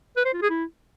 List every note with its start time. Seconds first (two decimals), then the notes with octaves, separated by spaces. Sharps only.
0.17 B4
0.25 C5
0.33 F4
0.42 G#4
0.50 E4